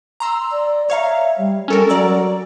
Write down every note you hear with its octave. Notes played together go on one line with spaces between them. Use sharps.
A#5 C6 E6
D5
C#5 E5 F5 A#5
G3
G3 C#4 A4 A#4
F#3 D5 A#5 E6